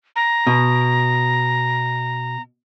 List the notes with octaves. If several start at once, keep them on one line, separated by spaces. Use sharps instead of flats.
A#5
B2